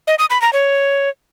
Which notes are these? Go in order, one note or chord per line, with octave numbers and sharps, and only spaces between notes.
D#5
D#6
B5
A#5
C#5